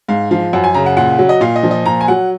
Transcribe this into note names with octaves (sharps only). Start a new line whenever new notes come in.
G#2 F5
F3 F5
F#2 F#5
G#5
C#3 A#5
F#5
A#2 F#5
F#3
D#5
A#2 F5
D#5
F3
D#5
A#2 A#5
G#5
F#3 F#5